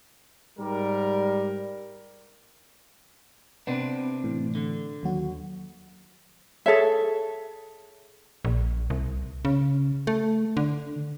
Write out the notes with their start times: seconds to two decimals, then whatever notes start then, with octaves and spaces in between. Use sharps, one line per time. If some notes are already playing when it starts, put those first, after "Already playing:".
0.58 G#2 G3 A#4
3.67 C3 B3 C4 D4 B4
4.24 A2 E3
4.55 D3
5.03 D#2 F#3 F#4
6.66 G#4 A4 C#5 E5
8.45 A#1
8.90 C2
9.45 C#3
10.07 A3
10.57 D3